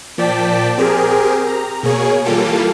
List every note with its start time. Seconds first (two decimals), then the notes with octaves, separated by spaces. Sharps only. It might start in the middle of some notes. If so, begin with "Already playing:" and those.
0.18 A#2 F3 D5 G5 A5 B6
0.78 C4 G4 G#4 A#4
1.47 A#5
1.83 B2 A#3 G#4 C#5
2.25 E3 G3 A#3 F4 G4 A4